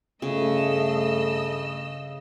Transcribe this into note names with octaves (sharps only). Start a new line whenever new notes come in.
G2 C#3 A3 D#5 E6